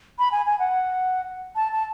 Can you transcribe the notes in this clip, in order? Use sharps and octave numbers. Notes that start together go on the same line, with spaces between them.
B5
G#5
G#5
F#5
A5
A5